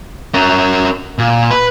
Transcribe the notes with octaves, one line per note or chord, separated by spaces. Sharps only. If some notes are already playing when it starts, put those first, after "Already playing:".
C#4 A#4
A#2
B4